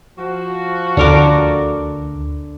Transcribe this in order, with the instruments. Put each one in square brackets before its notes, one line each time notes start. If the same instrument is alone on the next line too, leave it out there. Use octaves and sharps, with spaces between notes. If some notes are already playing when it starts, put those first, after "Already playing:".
[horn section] F3 F#4
[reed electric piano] D2 [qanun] D3 A#4 D6